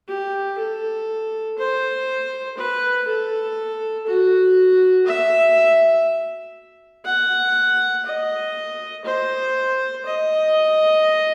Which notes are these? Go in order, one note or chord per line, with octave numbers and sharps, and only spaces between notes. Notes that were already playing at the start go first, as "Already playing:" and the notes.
G4
A4
C5
B4
A4
F#4
E5
F#5
D#5
C5
D#5